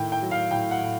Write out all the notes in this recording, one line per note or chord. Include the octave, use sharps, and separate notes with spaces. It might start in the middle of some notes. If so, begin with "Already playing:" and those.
Already playing: A2 D#3 G5
G5
F#3
F5
A2 G5
F#5
A2